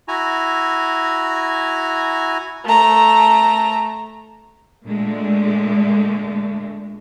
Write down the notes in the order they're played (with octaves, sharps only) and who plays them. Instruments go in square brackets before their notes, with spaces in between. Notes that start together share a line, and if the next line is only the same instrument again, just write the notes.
[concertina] E4 F#4 G#5 A#5
[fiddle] A3 A#5
[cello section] A#2 D3 G#3 A3